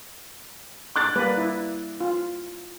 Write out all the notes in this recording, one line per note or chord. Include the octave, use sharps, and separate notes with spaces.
D6 F#6 A6
G3 A#3 B4
E4
F4